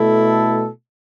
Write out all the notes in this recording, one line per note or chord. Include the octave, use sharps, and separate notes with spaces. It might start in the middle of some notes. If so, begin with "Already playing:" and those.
Already playing: B2 A3 E4 A4